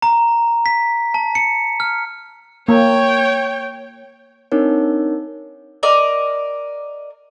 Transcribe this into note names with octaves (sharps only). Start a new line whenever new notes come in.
A#5
B6
A5
C#7
F6
A#3 C#5 G5
C4 D4 D#4 A#4 C#5
A#4 D5 D#5